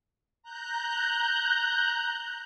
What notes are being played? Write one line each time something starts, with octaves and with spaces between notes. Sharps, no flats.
A#5 F#6 G6